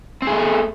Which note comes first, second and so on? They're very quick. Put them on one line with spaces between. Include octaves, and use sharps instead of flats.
C4 G#4 A3